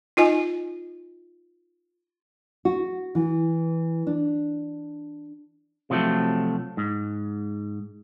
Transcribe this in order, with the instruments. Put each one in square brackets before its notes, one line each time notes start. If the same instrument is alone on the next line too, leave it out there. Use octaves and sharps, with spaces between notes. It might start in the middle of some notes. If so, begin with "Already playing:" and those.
[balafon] D#4 F4 D#5 G#5
[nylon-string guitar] F#4
E3
D4
[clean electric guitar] C3 F3 F#3 A3
G#2